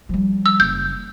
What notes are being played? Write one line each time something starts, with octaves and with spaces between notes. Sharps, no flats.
F3 G3
E6
F#1 G6